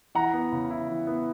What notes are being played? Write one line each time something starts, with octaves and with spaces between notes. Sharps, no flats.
E3 F#5 A#5
B3
C#3
E4
E3
B3